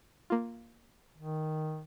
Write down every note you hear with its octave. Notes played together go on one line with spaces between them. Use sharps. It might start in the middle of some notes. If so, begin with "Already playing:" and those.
A#3 F4
D#3